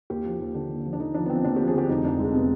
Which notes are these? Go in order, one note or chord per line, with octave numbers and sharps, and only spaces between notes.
D#2 G4
F3
D#2
D3
D#2
F3
D4
D3 D#4
F3 D4
B3
F3 C4
D#2 D4
F3 G4
G#4
D3 G4
F1 D#4
F2 D4
F1 G#3
C3 B3